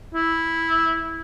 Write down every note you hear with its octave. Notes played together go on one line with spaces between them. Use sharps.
E4